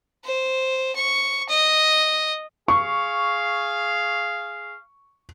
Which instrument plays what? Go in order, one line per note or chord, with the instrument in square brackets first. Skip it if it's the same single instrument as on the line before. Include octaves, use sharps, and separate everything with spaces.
[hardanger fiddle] C5
C#6
D#5
[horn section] G#4 F5 [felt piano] C#6